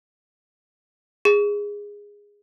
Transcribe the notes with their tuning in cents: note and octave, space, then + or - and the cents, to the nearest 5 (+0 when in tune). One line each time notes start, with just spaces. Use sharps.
G#4 -15